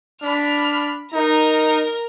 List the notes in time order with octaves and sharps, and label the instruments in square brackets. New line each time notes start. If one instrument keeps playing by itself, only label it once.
[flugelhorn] D4 [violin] B5 F6
[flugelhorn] D#4 [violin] A#4 A#5